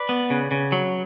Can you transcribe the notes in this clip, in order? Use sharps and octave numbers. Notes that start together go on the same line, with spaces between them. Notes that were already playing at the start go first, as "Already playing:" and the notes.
Already playing: B4 D5
B3
C#3
C#3
F#3